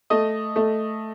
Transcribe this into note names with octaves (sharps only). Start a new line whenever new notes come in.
A3 D#5
A3